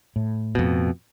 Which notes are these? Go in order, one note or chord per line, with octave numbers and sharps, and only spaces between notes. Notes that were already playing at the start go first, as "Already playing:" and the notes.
A2
F2 B2